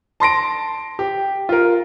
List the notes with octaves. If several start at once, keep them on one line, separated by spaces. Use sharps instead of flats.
A5 C6 A#6 D7
G4
F4 A#4